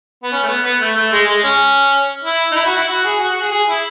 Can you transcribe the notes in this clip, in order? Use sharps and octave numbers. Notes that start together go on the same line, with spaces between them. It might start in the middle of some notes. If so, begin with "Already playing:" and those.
B3
C#4
A3
B3
B3
A3
A3
G#3
G#3
C#4
E4
D#4
E4
F#4
E4
F#4
G#4
F#4
F#4
G#4
G#4
E4